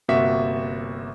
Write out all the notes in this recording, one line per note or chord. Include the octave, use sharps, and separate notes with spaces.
G1 C3 A#3 F#4 E5 B6